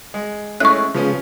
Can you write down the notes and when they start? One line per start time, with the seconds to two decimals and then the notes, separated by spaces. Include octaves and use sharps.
0.14 G#3
0.60 G#3 A3 C#4 E4 C#6 F#6
0.94 C#3 F3 G#3 B3 C#4 F4